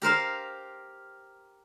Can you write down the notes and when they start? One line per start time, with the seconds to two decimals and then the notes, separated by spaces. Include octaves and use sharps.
0.02 G4 A#4 C5 F5